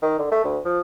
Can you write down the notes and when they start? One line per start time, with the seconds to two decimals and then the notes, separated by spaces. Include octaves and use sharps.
0.02 D#3
0.19 D3
0.31 A3
0.44 D2
0.65 F3